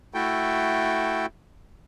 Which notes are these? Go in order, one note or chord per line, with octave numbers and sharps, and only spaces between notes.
A3 E4 F#4 A4 G5